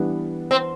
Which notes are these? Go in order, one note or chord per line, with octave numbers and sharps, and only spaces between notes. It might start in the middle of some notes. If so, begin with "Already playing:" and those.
Already playing: E3 G3 B3 D4
C4